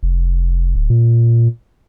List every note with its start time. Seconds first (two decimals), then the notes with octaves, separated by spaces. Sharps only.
0.03 F1
0.75 D1
0.90 A#2